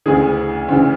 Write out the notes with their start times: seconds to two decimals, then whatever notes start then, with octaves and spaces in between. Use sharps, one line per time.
0.06 D2 C#3 E3 G#4
0.68 D2 C#3 E3